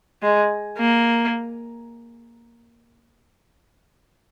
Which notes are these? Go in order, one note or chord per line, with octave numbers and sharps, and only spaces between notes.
G#3
A#3